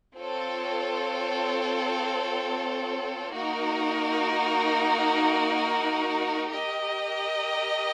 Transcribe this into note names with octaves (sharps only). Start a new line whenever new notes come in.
C4 F4 A4 C#5
A#3 D#4 F#4 A#4
G4 A#4 D#5